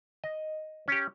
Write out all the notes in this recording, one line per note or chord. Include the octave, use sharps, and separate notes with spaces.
D#5
C#4 G4